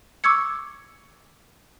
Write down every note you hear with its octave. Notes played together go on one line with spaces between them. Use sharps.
C#6 D6 E6 G#6 C#7